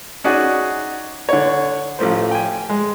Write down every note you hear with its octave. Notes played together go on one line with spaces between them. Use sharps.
C#4 D#4 F#4 G#4 D5 G#5
D3 C#5
A1 F3 A3 C5
G5 G#5
G#3